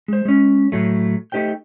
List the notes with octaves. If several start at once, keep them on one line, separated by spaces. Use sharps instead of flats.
G#3 C5
G#3 C#4
A2 F#3 A3
A3 D#4 G4 C5 G5